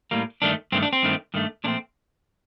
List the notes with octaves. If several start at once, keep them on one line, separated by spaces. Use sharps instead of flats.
A2 G3 A#3
G2 D#3 A3 D4
G2 D#3 A3 C4
D4
C4
G2 D#3 A3
G2 D#3 A3
A#2 F3 A3 C4 D4